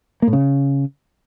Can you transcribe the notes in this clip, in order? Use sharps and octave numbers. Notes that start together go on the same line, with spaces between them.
A#3
A2
C#3